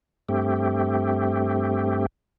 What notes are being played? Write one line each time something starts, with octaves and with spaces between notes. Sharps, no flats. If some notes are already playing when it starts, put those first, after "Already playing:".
G2 A3 C4 G4